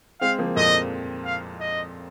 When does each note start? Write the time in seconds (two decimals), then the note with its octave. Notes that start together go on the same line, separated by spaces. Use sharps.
0.21 G#3 C4 F5
0.39 F3 A#3
0.56 F2 A#2 D#5
1.25 F5
1.60 D#5